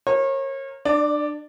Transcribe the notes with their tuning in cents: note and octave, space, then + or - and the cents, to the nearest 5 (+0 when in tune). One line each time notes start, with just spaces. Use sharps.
A#4 +0 C#5 -35
D4 +30 D5 +0